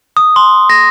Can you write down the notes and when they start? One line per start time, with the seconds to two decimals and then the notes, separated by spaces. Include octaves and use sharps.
0.17 D#6
0.36 C6
0.70 A#6